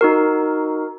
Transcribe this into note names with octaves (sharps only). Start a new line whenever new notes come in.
D#4 F#4 A#4